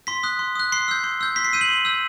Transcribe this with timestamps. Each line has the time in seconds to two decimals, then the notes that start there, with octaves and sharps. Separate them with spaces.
0.07 C6 B6
0.23 D#6 F#6
0.39 C6
0.55 D#6 F#6
0.72 C6 C7
0.88 E6 G6
1.04 C6
1.21 E6 G6
1.36 C6 B6
1.45 C7
1.53 E6 G6 D#7
1.61 F#7
1.69 C6
1.85 E6 G6